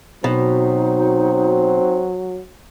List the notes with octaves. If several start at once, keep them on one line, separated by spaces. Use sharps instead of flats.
B2 F#3 C4 D#4